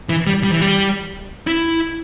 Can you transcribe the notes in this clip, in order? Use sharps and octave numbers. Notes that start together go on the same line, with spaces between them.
E3
G3
G3
E3
G3
E4